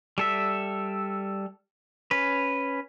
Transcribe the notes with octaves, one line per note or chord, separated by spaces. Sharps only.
G3 A4 E5
C#4 B4